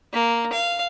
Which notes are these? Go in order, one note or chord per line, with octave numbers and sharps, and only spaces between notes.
A#3
F5